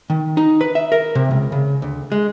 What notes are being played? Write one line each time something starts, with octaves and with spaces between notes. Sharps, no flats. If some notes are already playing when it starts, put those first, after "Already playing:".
D#3
D#4
B4
E5
A#4
C3
C#2
C#3
D2
G#3